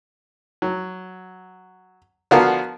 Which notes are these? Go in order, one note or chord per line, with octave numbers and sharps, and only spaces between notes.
F#3
D3 F3 B3 F#4 A#4 F5